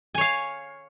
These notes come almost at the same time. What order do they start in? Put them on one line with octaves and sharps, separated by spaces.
G#5 C#5 F5